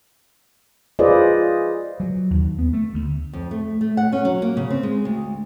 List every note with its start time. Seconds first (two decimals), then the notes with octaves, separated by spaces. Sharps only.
0.99 F4 G#4 B4 C5 D5 D#5
2.00 F#3
2.31 D#2
2.59 B3
2.73 A3
2.94 D2
3.33 F2
3.51 A3
3.81 A3
3.97 F#5
4.12 C#4
4.25 F#3
4.42 A#3
4.57 C#3
4.70 C4
4.83 G#3
5.05 D2